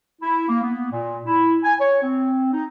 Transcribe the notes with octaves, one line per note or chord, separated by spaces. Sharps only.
E4
A#3
B3
A#2
E4
G#5
C#5
C4
D#4